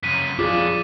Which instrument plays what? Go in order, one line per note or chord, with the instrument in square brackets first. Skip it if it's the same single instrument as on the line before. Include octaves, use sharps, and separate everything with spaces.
[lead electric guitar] F#2 C#3 [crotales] B6 D#7
[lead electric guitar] F2 D4 [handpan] F4 G#4 [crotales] D6